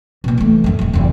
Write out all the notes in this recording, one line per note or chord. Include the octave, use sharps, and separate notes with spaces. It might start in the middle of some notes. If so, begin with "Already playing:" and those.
B2 A#3
E3 A3
F#2 A3
D#1 F2
F1 E2